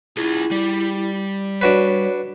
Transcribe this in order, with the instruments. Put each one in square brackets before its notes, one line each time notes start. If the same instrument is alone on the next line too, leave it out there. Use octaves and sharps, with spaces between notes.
[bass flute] E4 [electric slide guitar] F4 G#4
[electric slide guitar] G3
[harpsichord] D4 F#4 B4 [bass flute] C#5